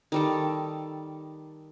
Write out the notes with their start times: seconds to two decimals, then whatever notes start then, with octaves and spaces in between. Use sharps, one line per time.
0.12 D#3 G3 A4